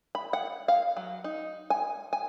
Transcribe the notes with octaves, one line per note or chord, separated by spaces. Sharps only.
B5
F#5
F5
F#3
D#4
G#5
G#5